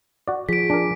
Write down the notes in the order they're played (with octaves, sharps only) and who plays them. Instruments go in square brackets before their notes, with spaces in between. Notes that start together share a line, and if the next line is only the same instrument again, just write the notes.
[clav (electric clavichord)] F#4 D5
[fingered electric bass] F3 [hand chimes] G#4 [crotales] B6 D7
[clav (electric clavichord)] D4 A#4 [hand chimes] G#5 D6